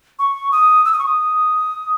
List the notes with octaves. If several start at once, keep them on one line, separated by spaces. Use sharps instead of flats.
C#6
D#6
E6
D#6
C#6
D#6